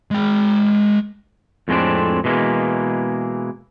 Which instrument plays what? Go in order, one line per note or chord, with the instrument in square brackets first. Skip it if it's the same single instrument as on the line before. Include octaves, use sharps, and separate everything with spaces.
[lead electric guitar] G#3 G5
[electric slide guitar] F2 A2 G#3 A3 C4 D4
B2 E3 G#3 A#3